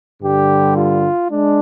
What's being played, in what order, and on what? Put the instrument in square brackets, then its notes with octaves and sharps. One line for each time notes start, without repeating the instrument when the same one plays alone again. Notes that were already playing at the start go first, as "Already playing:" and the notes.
[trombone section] G2 D3 G3 G4
F4
G#3 D4